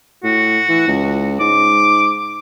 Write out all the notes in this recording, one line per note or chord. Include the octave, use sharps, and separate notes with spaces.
A2 F#4
E3
C#2
G#2 D6